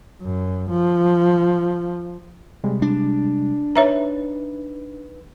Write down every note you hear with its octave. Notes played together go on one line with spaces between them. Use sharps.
F#2
F3
C3 G3 G#3
D4
D#4 B4 C#5 E5 A#5